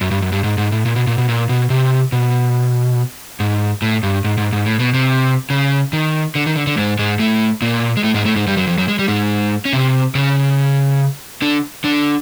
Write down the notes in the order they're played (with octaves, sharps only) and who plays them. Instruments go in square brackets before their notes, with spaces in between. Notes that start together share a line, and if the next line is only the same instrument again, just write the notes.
[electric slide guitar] F#2
G2
F#2
G2
G#2
G#2
A2
A#2
B2
A#2
B2
A#2
B2
C3
B2
G#2
A2
G2
G#2
G#2
G#2
A2
B2
C3
C#3
D#3
D3
D#3
D3
D3
G#2 G#3
G#2 G#3
A2 A3
A#2 A#3
G#3
A2 A3
G#2 G#3
A2 A3
G#2 G#3
G2 G3
F#2 F#3
F2 F3
F#2 F#3
G#3
G3
G#2 G#3
C#4
C3 C4
C#3 C#4
D3 D4
D3 D4